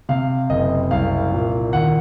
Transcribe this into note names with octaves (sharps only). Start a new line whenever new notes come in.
C3 F5
F#1 D#5
C2 F5
A#2
D#2 F#5